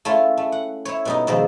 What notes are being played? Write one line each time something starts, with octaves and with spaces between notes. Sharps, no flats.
A3 C#4 E4 F4
A3
F#5
E4 C#5
B2 G3 D#4
B2 D#3 F3 G#3 C4